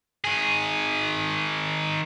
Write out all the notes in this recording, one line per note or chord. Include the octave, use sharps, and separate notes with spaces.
D#3 G#4